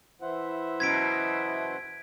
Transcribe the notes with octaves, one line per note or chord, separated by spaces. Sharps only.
E3 E4 C5 E5 F#5
F#2 B2 G#6 B6 D7